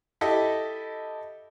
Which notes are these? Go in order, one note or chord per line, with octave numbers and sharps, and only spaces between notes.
E4 G4 A4 D#5